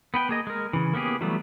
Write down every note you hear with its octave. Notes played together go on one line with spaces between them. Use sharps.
B3 B4 G5
A#3 G#4 D#5
G#3 A#4
C#3 E3
A#3 B3 C#4 G4 G#4
E3 F#3 G3 A3 B3